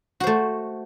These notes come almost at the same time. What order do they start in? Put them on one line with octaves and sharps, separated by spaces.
F#4 C5 A3